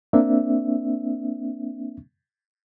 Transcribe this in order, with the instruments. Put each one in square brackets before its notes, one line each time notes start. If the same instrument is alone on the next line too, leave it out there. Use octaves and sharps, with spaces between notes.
[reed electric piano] A#3 C4 D4 E5